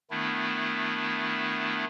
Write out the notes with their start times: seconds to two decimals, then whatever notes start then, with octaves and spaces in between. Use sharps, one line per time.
0.11 D#3 A3 B3 D4 E4